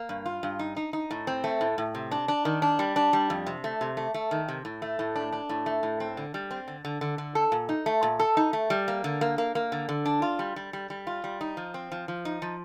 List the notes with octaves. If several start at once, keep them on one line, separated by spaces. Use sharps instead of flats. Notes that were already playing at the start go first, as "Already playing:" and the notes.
Already playing: A#3
G2
F4
G2
D#4
D#4
D#4
A2
C4
A3
A2
A2
C3
D4
D4
D#3
D4
G3
D4
G3
F2
C3
A3
C3
A3
A3
D#3
C3
A2
A3
A2
D4
D4
A2
A3
A2
C4
D3
G3
C4
D3
D3
D3
D3
A4
A#2
D#4
A3
A#2
A4
D#4
A3
G3
A#3
D3
A#3
A#3
A#3
D3
D3
D4
F4
G3
G3
G3
G3
F4
G3
D#4
F3
C4
F3
F3
D#4
F3